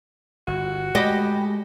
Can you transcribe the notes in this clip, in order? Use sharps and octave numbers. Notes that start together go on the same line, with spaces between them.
G1 F#4
G#3 A3 G4 D#5 B5